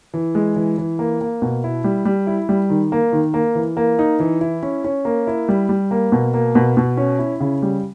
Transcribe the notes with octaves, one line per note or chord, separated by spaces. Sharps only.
E3
G#3
E3
E3
A#3
A#3
B2
E4
G3
G3
E4
G3
D#3
A#3
D#3
A#3
E3
A#3
D#4
E3
E4
C#4
C#4
A#3
E4
G3
G3
A#3
B2
A#3
B2
B2
C#4
E4
C#3
G3